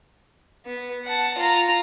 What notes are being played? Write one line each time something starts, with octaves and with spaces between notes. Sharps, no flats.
B3
F#5 A5
F4 A#5